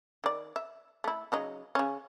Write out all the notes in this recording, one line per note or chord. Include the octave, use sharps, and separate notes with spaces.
D#3 D5
E5
A3 E4
C#3 F#3 D#4
C#3 C#4